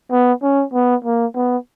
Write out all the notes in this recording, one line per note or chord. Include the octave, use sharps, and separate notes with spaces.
B3
C#4
B3
A#3
B3